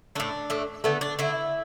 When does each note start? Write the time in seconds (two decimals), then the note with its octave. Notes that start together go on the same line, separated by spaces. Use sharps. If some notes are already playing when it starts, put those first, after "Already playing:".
0.15 A2 A3 D4
0.50 A2 A3
0.84 D3 A3 B3
1.01 D4
1.19 D3 A3 E4